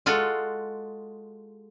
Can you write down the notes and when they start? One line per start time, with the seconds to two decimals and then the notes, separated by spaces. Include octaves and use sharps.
0.06 G#3 F4 F#4 A4